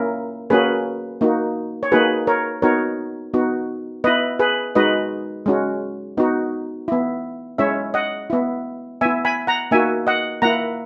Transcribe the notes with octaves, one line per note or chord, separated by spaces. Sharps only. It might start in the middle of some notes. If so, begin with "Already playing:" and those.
Already playing: A#3 C#4 E4 A#4
A#3 C#4 F#4 G#4 B4
A#3 D#4 F#4
C#5
A#3 D#4 F#4 G#4 B4
A#4 C#5
B3 D#4 F#4 A#4 C#5
B3 D#4 F#4
B3 E4 B4 D#5
G#4 B4
G#3 D#4 F#4 B4 D#5
G#3 C#4 F#4
B3 D#4 F#4
B3 E4
G#3 C#4 E4 C#5 E5
D#5 F#5
B3 E4
B3 E4 E5 G#5
G#5 B5
F#5 A#5
A#3 D#4 F#4 E5 G#5
D#5 F#5
A#3 E4 F#5 A#5